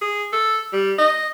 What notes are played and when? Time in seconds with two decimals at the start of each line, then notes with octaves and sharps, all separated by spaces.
0.01 G#4
0.32 A4
0.73 G3
0.98 D#5